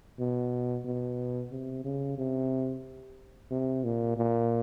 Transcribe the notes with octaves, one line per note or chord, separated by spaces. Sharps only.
B2
B2
C3
C#3
C3
C3
A#2
A#2